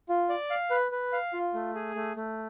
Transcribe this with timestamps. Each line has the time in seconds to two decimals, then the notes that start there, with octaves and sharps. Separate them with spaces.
0.09 F4
0.29 D5
0.50 F5
0.70 B4
0.92 B4
1.12 F5
1.33 F4
1.54 A3
1.75 G#4
1.95 A3
2.16 A3